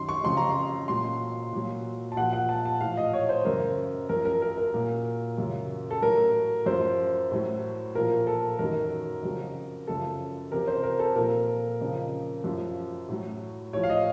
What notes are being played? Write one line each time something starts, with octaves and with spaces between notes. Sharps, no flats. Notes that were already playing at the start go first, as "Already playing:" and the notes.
Already playing: F#2 D#3 F#3 C6
C#6
F2 C#3 F#3 C6
A#5
C6
A#2 F#3 C6
A#2 F#3
A5
A#2 F3 F#5
F#5
A5
A5
A2 F3 F5
D#5
C#5
C5
F#2 C#3 F#3 A#4
F#2 F3 A#4
A#4
A#4
A#4
A#2 F#3
F#2 C#3 F#3
A4
A2 F#3 A#4
F#2 F3 C5
A2 F#3
A#2 F3 A#4
A4
F#2 D#3 F#3 A#4
F2 C#3 F#3
F#2 C#3 F3 A4
F2 C3 F3 A#4
C5
A#4
A4
A#2 F3 A#4
F2 C#3 F3
F#2 F3
A2 F#3
A2 F3 C#5
F5
D#5